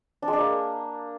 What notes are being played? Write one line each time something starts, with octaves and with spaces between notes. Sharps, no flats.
D4
G#3
D4
A#3